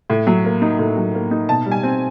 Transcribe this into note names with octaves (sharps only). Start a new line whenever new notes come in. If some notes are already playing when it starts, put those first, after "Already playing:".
A2
F#3
A#3
D#4
A2
F#3
A#3
D#4
B2 A5
G3
G#5
C4